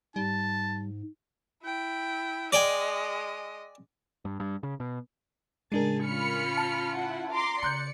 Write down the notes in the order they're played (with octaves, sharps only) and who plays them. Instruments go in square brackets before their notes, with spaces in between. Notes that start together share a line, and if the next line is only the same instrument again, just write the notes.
[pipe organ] G#2 [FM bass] G3 [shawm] A5
[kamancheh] E4 G5
[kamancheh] G#3 D#5 [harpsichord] D5 G5 G#5
[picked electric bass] G2
G2
C#3
B2
[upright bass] A2 C#3 [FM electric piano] G#3 D4 A#4 [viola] G#4 A5
[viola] C#4 F4 [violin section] B5 F6 C#7
[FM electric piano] A5
[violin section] E4 F#5
A#5 C6 D6
[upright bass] C#3 [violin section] D5 C#7 [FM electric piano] A#5 F#6 G6